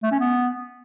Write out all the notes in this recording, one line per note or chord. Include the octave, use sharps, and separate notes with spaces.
A3
C#4
B3